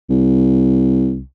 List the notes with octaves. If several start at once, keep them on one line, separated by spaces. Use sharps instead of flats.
C2